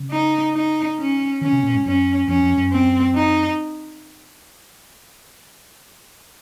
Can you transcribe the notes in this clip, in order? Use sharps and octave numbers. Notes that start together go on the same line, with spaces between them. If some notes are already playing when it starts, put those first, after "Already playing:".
Already playing: C#3
D#4
D#4
C#4
D#3 C#4
C3
A#2
G#2
F#2 C#4
F2 C#4
F2
F#2
C4
D#4